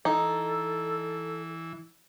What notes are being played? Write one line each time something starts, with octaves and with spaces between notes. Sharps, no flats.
E3 D#4 A4